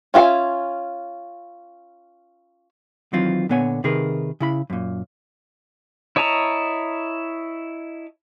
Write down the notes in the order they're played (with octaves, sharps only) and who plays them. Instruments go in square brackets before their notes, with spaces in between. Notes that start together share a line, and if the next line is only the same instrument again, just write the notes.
[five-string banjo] C#4 F4 G#4 E5 G#5
[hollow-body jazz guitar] D#3 E3 F#3 C4 F4
A#2 D3 B3 C#5 G#5
C3 D#3 G#4 A#4 B4
C#3 E4 B5
F#2 A#2
[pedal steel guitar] E4 C#5 D#5 A5 A#5